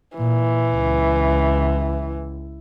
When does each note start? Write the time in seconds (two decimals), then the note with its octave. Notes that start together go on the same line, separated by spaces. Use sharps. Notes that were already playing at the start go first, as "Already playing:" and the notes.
0.17 A#2 E3
0.71 C#2